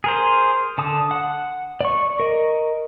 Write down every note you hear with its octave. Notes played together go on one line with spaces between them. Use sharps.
G#4 A#4 C5
D3 A5 D#6
F#5
D5 C#6
A#4 D#5